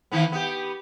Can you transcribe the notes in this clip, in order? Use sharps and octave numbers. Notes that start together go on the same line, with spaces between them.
D#3 E3 B3
B3 G4